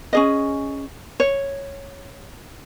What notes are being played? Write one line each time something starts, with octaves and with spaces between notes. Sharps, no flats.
C#4 G#4 D#5
C#5